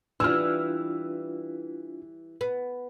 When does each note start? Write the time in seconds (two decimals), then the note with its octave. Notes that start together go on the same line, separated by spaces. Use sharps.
0.20 E3 G3 D4 F4 E6 F6
2.41 B3